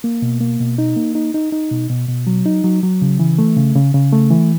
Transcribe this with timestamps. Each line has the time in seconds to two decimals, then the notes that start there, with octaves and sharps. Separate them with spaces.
0.04 A#3
0.22 B2
0.41 A#3
0.60 B2
0.78 D#4
0.96 A#3
1.15 D#4
1.34 D#4
1.52 D#4
1.71 B2
1.89 B2
2.08 B2
2.27 F#3
2.46 D#4
2.64 F#3
2.83 F#3
3.02 C#3
3.20 E3
3.38 A3
3.57 C#3
3.76 C#3
3.94 C#3
4.13 A3
4.31 E3